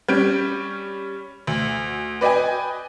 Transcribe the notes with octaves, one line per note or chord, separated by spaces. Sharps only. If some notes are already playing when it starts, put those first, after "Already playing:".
G3 C#4 G6 D7
D2
B4 D5 D#5 G5 G#5